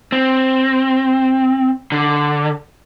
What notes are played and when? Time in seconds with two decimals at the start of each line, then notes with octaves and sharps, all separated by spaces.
0.12 C4
1.92 D3